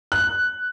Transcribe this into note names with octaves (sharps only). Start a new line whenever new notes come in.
F#6